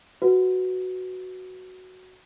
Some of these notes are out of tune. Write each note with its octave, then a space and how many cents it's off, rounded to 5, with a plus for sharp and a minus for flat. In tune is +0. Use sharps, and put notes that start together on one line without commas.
F#4 +0 B4 +0